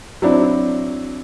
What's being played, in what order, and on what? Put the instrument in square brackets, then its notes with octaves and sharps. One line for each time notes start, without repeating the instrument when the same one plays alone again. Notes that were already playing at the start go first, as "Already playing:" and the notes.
[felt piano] F#3 C4 D4 E4